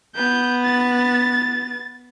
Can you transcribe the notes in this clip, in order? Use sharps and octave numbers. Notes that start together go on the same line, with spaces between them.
B3 G6
A6